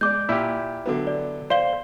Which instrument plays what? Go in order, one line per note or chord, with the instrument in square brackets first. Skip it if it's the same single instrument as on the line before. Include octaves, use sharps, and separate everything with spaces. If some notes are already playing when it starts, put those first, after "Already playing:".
[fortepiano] G#3 D5 [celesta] D6 G6
[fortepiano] A#2 [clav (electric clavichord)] E4 G4
[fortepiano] D3 F#3 B3
[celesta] D5
[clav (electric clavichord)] C5 [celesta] D5 F5 G7